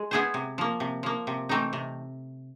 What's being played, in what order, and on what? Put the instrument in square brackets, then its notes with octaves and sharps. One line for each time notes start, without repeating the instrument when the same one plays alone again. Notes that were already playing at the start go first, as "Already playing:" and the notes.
Already playing: [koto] G#3
B3 E4 G#4 C5
C3
F3 A#3
C3
F3 A#3
C3
E3 A3 C4 D#4
C3